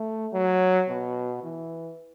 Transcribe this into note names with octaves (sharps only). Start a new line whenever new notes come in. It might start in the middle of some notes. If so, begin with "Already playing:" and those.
Already playing: A3
F#3
B2
E3